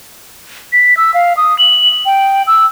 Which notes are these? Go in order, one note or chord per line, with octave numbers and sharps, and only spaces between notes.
B6
E6
F5
D#6
F#7
G5
E6